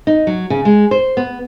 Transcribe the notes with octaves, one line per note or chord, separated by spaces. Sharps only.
D#4
F#3
C#3
G#3
C5
B3